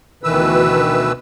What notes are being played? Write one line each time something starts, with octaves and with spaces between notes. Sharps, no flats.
D2 B2 D#3 E3 B4 E6